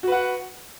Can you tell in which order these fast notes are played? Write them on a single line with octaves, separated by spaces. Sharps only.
F#4 B4 F#5